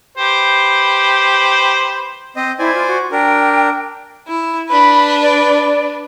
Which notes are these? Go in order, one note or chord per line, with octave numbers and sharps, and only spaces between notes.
G4 B4 C5
C4 C5 D#5
E4 C5 D5 G#5
F4
F#4
D4 A#4 G5
E4
D4 B4 B5
D5